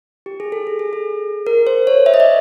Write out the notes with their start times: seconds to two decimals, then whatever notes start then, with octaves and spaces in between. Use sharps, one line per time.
0.26 G4
0.40 G#4
0.52 A4
0.67 G#4
0.79 G#4
0.93 G#4
1.47 A#4
1.67 C5
1.87 C#5
2.06 E5
2.14 D#5
2.20 D5